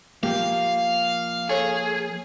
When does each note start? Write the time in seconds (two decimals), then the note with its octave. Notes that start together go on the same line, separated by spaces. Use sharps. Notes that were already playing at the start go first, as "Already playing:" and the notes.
0.23 F3 A#3 G4 F5
1.49 G#4 A4 C#5